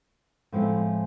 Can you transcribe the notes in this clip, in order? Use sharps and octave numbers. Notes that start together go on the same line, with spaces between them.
A2 F3 G#3 C4 E4